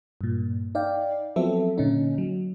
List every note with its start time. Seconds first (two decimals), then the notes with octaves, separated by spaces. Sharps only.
0.21 G2 A#2
0.75 D#4 D5 F5 G5
1.36 F3 F#3 B3 C4 A4 E5
1.78 A#2 D3 C#4 D#4
2.18 F#3